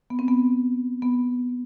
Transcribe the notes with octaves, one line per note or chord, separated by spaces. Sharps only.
B3
C4
B3
B3